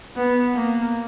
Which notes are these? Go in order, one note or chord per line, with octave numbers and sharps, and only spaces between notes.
B3
A#3